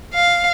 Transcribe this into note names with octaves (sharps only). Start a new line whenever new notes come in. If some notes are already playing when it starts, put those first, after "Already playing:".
F5